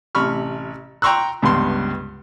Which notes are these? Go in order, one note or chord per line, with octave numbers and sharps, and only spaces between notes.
A1 C3 B5 C#6 F6
G5 A#5 C6 C#6 E6 F#6
C#2 G2 B3 C6